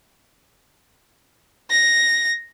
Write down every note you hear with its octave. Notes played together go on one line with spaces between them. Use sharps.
A#6